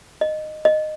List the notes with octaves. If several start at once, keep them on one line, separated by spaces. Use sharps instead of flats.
D#5
D#5